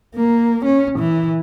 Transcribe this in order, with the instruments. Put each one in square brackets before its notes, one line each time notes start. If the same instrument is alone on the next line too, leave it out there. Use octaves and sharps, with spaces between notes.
[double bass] A#3
C#4
E3